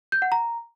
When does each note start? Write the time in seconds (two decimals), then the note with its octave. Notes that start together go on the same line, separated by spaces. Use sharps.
0.12 G6
0.22 F#5
0.32 A#5